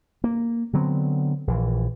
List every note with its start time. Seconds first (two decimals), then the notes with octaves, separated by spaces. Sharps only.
0.24 A#3
0.73 D3 F#3 B3 C4
1.47 A#1 E3